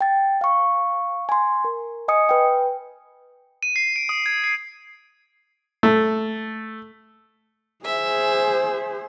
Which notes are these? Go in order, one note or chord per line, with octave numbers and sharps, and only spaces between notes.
G5 A6
F5 C#6
G#5 C6
A#4
D#5 G#5 D#6 C#7
B4 G5
D#7
C7
D7
D#6
G#6
C7
A3
G#4 C5 E5